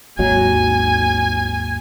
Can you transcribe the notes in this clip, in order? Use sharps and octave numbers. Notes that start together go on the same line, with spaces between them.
G#1 D#2 F#3 G#5